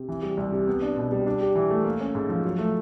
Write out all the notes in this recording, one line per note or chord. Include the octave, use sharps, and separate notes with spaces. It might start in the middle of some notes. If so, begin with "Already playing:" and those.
Already playing: C3
E3
G3
C2
C3
B3
D4
B2
G3
D4
G4
E3
A3
A#3
C#4
G#2
F3
F#3
A3